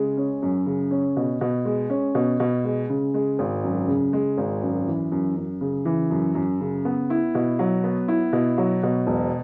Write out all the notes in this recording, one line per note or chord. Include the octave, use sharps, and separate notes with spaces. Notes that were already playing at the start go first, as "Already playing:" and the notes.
Already playing: C#3 G#3
C#4
F#2
C#3
C#4
B2
B2
G#3
C#4
B2
B2
G#3
C#3
G#3
G#1
F#2
C#3
G#3
G#1
F#2
E3
F#2
F#2
C#3
E3
F#2
F#2
C#3
B3
E4
B2
F#3
B3
E4
B2
F#3
B2
E1